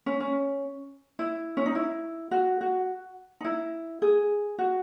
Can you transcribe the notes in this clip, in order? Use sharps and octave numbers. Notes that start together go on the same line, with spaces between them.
C#4
C#4
E4
C#4
D#4
E4
F#4
F#4
D#4
E4
G#4
F#4